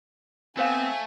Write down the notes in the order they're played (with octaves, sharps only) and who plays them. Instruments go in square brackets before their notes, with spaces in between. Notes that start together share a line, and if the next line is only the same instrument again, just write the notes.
[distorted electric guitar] A3 [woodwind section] B3 C4 [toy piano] D#4 C5 F5 [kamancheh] G#5